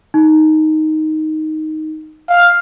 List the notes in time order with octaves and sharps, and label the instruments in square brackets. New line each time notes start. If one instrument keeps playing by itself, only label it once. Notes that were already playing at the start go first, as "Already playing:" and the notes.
[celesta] D#4
[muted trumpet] F5